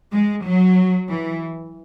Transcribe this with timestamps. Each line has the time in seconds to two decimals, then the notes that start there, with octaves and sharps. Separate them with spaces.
0.12 G#3
0.45 F#3
1.09 E3